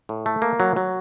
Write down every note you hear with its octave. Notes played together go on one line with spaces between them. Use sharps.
A2
A3
A#3
F#3
F#3